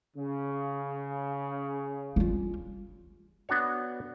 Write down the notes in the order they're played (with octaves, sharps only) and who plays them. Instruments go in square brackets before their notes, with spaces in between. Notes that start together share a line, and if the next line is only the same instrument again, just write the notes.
[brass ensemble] C#3
[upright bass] G3 F4
[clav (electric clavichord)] B3 D4 F#4 C#5